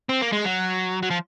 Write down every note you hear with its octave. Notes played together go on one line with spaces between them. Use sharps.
C4
A#3
G#3
F#3
F#3
F3